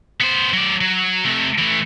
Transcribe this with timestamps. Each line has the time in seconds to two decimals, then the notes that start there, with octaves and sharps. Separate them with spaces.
0.21 B3 C5
0.53 F#3 D5
0.81 F#3
1.24 C3 A3
1.58 E3 A3